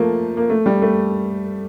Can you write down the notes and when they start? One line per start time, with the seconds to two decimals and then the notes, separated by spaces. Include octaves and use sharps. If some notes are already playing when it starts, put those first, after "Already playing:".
Already playing: F3 A3 A#3
0.37 A#3
0.50 A3
0.66 G3
0.82 A3